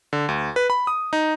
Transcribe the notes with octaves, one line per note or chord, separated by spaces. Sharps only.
D3
D2
B4
B5
D#6
D#4